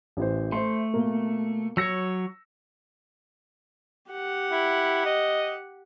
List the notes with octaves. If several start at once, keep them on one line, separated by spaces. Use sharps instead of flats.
A1 E3 C5
A3 C5 E5 C6
B2 A#3
F#3 C#5 E6 A#6 C#7
G4 F#5
E4
D#5